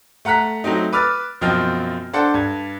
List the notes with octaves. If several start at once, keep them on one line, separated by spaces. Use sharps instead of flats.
A3 F#5 A#5 F#6 B6
F#3 A3 C4 D#4
B4 D6 E6 F6 A6
F#2 B2 F3 C4 D#5 F6
D4 A4 C5 F#5 A5
G2 G#6